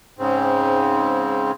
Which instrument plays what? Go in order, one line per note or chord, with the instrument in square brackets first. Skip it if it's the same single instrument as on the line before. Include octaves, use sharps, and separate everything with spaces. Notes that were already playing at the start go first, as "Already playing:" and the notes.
[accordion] G#2 C#3 C4